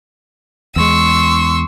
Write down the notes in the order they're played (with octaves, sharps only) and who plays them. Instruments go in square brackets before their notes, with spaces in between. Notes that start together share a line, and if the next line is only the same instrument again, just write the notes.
[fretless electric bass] E2 G#3 [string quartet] C6 C#6 E6